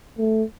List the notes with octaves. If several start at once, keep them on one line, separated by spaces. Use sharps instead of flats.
A3